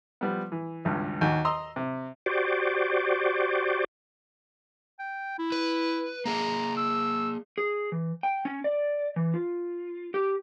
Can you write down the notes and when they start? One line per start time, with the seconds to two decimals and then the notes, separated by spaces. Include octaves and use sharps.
0.21 F3 G3 B3
0.52 E3
0.85 G#1 C#2 G2
1.21 D#2 F#4 G#5
1.45 D#5 A#5 C6 E6
1.76 C3
2.26 F#4 G4 C5 D5
4.99 G5
5.39 E4
5.52 B4
6.25 A#3 G#4 A#5
6.77 E6
7.58 G#4
7.92 E3
8.23 G5
8.45 C#4
8.64 D5
9.16 E3
9.34 F4
10.14 G4